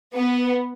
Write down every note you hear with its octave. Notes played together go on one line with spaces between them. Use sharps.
B3